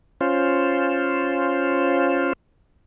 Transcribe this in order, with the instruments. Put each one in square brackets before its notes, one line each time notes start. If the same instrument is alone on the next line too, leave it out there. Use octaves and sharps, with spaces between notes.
[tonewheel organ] C#4 F4 C5